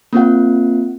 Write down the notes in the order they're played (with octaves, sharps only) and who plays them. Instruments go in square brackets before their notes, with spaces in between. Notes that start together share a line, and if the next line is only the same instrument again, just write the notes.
[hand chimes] A#3 C4 F4 F#5